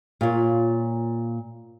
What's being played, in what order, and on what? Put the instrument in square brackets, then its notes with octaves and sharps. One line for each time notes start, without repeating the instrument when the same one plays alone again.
[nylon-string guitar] A#2 F4 C#5